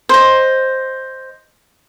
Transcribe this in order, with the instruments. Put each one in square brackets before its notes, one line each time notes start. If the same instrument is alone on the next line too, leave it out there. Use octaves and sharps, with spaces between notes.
[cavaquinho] C5 D#5